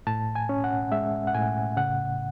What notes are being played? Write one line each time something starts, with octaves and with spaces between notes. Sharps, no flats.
A2 A5
G#5
C#4
F#5
G#3 E5
F#5
A2 G#5
C#3 F#5